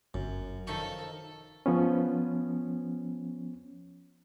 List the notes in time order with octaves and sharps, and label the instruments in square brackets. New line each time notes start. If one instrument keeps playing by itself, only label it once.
[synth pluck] G1 [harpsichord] F#2
[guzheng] D#3 F3 D#4 [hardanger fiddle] A4 [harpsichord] C#6
[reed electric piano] F3 B3 C#4